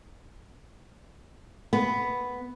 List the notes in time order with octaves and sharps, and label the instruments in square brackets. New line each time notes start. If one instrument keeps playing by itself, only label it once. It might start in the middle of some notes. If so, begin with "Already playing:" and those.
[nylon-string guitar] B3